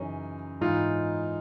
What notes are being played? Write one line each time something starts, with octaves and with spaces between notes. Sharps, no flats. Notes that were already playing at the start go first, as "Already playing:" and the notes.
Already playing: F#2 C#3 E3 C#4 D#4
G#2 E3 D#4 F4